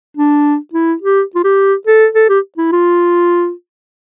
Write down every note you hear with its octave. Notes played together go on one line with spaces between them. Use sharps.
D4
E4
G4
F4
G4
A4
A4
G4
E4
F4